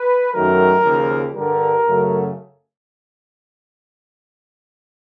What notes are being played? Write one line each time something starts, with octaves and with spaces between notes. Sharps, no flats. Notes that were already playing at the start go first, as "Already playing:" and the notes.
Already playing: B4
F#2 D#3 F#3 A3 A#4
D#2 C#3 F3
G2 D3 G3 A#4
F#2 C#3 F#3 A3